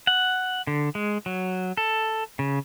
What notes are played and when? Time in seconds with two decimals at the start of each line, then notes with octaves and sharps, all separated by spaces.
0.07 F#5
0.67 D3
0.95 G#3
1.26 F#3
1.77 A4
2.39 C#3